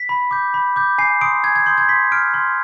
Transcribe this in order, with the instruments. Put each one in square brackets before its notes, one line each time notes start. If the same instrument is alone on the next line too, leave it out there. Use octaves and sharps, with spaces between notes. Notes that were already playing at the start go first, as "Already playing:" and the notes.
Already playing: [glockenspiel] B6
B5
D6 G6
B5
D6 G6
G#5 C7
C6 D#6 D7
G#5 G#6
G#6
C6 D#6 G6
G#6
C6 B6
F6 D7
C6